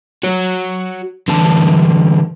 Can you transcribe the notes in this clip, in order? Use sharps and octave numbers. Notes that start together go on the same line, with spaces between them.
F#4 C#5
D3 E3 G3 D4 A5